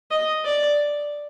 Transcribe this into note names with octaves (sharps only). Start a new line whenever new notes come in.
D#5
D5